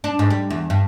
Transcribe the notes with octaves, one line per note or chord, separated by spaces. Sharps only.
D4
G#2
G3
E2
G2